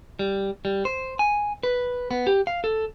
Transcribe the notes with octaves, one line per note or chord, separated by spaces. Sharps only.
G3
G3
C5
G#5
B4
B3
G4
F5
A4